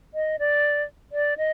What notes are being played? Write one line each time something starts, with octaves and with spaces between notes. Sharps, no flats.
D#5
D5
D5
D#5